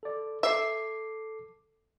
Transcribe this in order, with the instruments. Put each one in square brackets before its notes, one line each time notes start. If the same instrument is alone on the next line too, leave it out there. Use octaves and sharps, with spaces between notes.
[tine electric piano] A4 D5
[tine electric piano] A4 D6 C7 [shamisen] E5